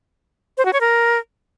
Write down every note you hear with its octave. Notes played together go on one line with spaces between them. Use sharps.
C5
F#4
C#5
A#4